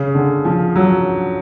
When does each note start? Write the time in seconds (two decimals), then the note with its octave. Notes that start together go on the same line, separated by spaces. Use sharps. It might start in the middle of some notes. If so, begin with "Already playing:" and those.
Already playing: C#3
0.15 D3
0.45 F3
0.76 F#3